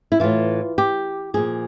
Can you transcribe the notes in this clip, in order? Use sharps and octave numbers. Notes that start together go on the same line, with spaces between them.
E4
A2 E3 F4
G4
A#2 F3 G#4